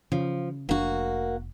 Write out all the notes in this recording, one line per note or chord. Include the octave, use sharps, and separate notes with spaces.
C#3 F3
F1 A#3 D4 F#4